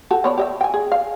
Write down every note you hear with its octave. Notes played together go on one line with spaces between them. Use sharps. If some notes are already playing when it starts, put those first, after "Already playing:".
F#4 G4 A4
B3 C#5 D5
G4 D#5 E5
G5 G#5
G#4
F5